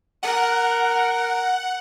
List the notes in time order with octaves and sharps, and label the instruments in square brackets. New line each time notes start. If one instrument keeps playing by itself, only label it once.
[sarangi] A#4 [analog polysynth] F#5